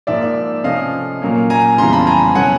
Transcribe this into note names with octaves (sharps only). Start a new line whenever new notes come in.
G#2 F3 A#3 D5 E5
C3 F3 A3 C#4 D#5 F5
A#2 F#3 A#3 C#4
G#5 A#5
F2 C#3 E3 G3 B3 A#5 C6
A5 B5
G#5 A#5
B2 F#3 A3 C#4 F#5 G#5